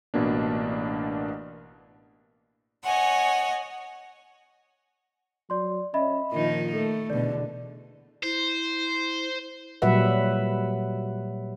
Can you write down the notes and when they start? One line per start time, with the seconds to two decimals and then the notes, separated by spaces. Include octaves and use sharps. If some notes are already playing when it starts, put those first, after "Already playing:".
0.14 A1 B2 A#3 D4
2.84 C#5 D#5 F#5 G#5
5.50 F#3 D5 C6
5.94 C#4 D#5 E5 B5
6.32 A#2 D#3 F3 D#4
6.73 A3 A4
7.10 E2 B2 D3 D5
8.23 E4 C5
9.82 A#2 F#3 G3 B4 E5 F#5